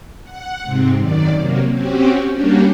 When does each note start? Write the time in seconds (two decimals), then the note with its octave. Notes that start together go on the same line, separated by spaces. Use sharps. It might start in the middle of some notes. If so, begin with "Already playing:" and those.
0.23 F#5
0.64 G#2 C3 C4
0.96 F#2 D#3 D5
1.36 C3 F#3 A#3
1.70 C4 C#4 F#4 G4
2.32 G3 A#3 C#4 D4 F#4 G4